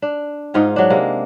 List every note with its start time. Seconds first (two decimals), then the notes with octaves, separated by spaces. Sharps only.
0.02 D4
0.54 G#2 D#4 F4 G#4
0.76 F#3 D4
0.90 C3 G#3 A#3